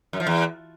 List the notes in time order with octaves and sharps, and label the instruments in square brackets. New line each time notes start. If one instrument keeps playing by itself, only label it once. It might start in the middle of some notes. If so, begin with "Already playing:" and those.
[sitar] F#2
F3
E2